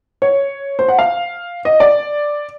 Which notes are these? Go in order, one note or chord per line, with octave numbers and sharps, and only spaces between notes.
C#5
C5
F#5
F5
D#5
D5